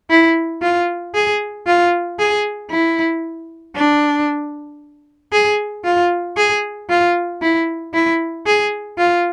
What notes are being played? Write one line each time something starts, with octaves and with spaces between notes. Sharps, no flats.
E4
F4
G#4
F4
G#4
E4
D4
G#4
F4
G#4
F4
E4
E4
G#4
F4